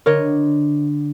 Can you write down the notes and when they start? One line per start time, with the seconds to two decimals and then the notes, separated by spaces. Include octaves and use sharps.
0.06 D3 A#4 C#5 D#5